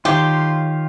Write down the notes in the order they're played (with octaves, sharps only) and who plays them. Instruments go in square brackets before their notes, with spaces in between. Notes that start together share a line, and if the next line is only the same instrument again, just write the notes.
[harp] D#3 [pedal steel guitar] F4 C#5 [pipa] G4 [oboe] C6